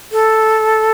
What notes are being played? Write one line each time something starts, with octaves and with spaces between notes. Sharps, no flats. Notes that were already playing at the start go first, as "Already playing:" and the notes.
A4